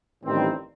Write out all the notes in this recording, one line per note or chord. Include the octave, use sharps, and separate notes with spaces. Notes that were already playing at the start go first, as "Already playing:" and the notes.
A1 G2 D#3 G3 C4